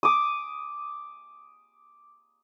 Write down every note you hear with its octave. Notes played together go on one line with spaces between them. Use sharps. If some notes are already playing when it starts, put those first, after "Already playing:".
D6 D#6